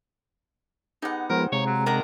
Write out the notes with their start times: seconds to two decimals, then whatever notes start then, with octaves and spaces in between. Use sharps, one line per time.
1.02 B3 D#4 G4 G#4 F#5
1.30 F3 G#3 B3 A#4 C5
1.52 C3 G#3 C#5 F5 A#5
1.66 F#3
1.86 D#3 D4 A#4 F#5 A#5